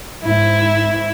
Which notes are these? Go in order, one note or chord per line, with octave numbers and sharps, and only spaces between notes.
G#2 E4